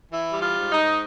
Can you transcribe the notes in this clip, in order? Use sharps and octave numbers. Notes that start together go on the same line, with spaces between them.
E3 E4
G3
F4
G#2
D#4
G#2